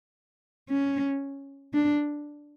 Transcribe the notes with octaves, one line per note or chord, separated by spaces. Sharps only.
C#4
D4